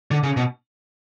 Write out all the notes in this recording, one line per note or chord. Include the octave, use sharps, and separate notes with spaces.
D3
C#3
B2